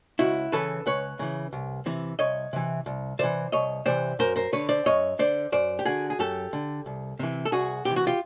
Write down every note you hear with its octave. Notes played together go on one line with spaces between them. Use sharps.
C#2 E4 F#4
C#3 E3 A4 B4
C#2 B4 C#5
C#3 E3
C2
C3 E3
C2 C#5 D#5
C3 E3
C2
C3 E3 C5 D5
C2 C#5 D#5
C3 E3 C5 D5
F#2 A#4 C5
A#4 C5
D3 B4 C#5
C5 D5
F#2 C#5 D#5
D3 C5 D5
F#2 C5 D5
G4
D3 F#4 G#4
G#4
F#2 G4 A4
D3
C2
C3 E3
A4
C2 F#4 G#4
C3 E3 G4
F#4
F4 G4